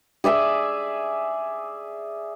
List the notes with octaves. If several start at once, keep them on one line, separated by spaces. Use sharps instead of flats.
G#4 D5 E5 G#5